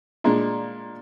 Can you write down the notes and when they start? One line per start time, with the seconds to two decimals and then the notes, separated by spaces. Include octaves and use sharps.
0.24 A#2 G#3 D4